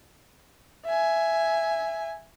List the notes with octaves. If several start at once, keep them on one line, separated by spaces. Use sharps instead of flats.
E5 G#5